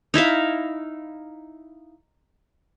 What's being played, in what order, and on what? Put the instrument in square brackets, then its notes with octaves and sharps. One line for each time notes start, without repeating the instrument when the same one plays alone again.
[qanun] D#4 E4 E5 F5